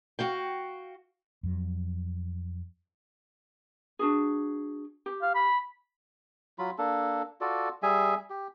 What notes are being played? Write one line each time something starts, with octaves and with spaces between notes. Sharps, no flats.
F#4 F5 G5
F2 F#3
D4 F#4 G#4
G4
F5
B5
F#3 F4 B5
A#3 D4 A4
F4 F#4 A4 D5
G3 G#4 E5 G#5
G4